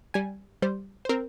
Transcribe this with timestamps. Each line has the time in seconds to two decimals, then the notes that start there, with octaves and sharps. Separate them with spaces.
0.14 G3 G#5
0.62 G3 C5
1.05 C5
1.09 C4 A#4